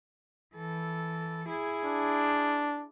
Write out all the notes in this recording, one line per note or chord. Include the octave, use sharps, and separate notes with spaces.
E3 A4
E4 G#4
D4